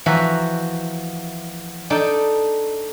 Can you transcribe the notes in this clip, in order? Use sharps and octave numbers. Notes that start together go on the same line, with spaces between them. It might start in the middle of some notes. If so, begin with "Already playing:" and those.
E3 F3 F#4 E5 F#5 A#5
D4 D#4 A4 G5